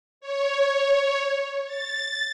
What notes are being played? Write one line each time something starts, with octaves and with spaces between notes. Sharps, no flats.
C#5
A6